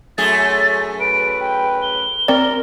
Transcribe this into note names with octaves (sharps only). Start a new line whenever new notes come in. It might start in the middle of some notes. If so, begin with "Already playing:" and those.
F#2 A3 G#4 A6
B4 D7
G5
G7
C4 A#4 D5